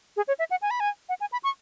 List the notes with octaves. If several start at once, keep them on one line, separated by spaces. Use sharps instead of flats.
G#4
C#5
E5
F#5
G#5
B5
G#5
F#5
G#5
B5
C#6